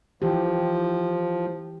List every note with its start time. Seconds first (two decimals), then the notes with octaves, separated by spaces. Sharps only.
0.22 E3 F3 G4